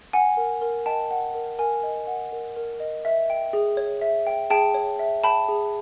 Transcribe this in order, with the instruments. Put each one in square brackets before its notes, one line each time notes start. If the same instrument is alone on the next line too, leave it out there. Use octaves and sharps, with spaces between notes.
[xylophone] F#5 G#5
A#4
A#4
D#5 G5 A5
F#5
A#4
A#4 G#5
D#5
F#5
A#4
A#4
D#5
E5
G5
G#4
C#5
E5
G5
G#4 G5 A5
C#5
E5
G5 A5 B5
G#4